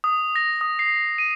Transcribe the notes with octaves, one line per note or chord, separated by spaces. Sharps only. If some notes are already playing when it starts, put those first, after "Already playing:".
D#6
A#6
D#6
C7
D#7